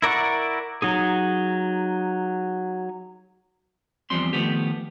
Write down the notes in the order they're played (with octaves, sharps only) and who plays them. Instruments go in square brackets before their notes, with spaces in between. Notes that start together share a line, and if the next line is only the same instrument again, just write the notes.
[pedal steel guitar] E4 A#4 D5 F#5 C#6
F#3 D#4 G#4
[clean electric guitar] E2 F3 G3 C4 C6
D#3 F3 A3 B3 G4